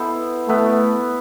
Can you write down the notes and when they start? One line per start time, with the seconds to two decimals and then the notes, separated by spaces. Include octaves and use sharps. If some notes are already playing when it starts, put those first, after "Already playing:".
Already playing: B3 E4 A4 C5
0.48 A3 B3 E4 B4